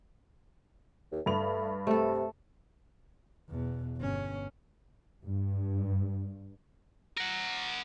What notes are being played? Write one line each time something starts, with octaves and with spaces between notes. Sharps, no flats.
D#2
G2 A3 F7
C3 A3 A4
E2 B2
G1 C#4
G2
A#4 F#5